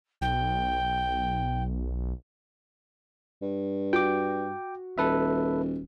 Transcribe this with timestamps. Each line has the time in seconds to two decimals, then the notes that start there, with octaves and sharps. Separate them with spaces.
0.21 B1 G5
3.42 G2
3.93 F#4 G5 D6
4.98 D#1 A4 B4 E5